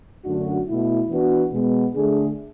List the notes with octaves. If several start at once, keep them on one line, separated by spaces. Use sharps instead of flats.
F#2 D3 A3 D4 F#4
B2 A3 E4
E3 B3 D4 F#4 B4
B2 G#3 B3
D3 A3 D4 G#4